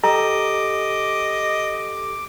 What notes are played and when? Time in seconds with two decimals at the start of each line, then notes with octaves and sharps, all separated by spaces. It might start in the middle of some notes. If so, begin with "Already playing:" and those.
0.04 G4 A4 D#5 A#5 D6